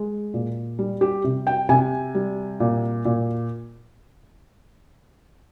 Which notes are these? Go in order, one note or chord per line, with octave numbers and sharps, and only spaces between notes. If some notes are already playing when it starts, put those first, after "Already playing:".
Already playing: G#3
A#2
G3
G4
C3
G5
C3 G#5
G3
A#2
A#2